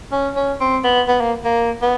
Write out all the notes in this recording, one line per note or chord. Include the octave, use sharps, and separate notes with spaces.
C#4
C#4
C4
B3
B3
A#3
A#3
B3